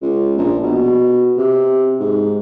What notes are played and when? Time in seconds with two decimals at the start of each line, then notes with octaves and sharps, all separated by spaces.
0.02 C#2
0.38 A#1
0.63 B2
1.37 C3
2.00 G#2